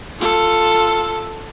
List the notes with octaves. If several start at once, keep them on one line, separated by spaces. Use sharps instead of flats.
F4 A4